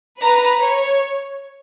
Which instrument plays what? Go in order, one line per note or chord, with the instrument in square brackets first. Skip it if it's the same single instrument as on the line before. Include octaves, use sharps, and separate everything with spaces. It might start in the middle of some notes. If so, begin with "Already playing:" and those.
[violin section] B4 [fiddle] A#5
[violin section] C#5